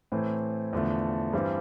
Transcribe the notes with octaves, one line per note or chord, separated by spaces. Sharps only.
A2 E3 A3 C4
E2 D3 F3 A3
G2 E3 G3 C4